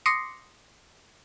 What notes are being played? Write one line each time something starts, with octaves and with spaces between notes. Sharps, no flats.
C6 D6 D#6 A#6 C7 C#7